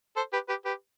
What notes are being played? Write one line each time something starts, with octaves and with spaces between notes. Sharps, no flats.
A4 C5
G4 B4
G4 B4
G4 B4